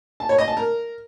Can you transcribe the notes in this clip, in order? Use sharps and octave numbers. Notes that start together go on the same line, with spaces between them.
A5
C#5
D#5
A5
A#4